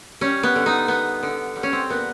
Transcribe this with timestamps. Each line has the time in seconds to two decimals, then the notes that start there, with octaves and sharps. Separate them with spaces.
0.21 G3 C#4
0.43 B3
0.56 D3
0.66 D#4
0.88 B3
1.23 D3
1.56 G3
1.63 C#4
1.73 C4
1.90 A#2 B3